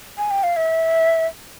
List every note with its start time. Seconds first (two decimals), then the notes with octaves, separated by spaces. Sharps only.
0.18 G#5
0.31 G5
0.43 F5
0.56 E5